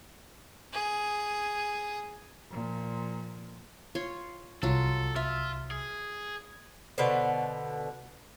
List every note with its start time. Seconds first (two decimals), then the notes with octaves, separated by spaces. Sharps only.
0.73 G#4
2.51 A#2 F3
3.95 F4 C#5 C6
4.63 C2 F#3 F4 A4
5.16 F4 E5
5.71 G#4
6.98 B2 D3 B4 C5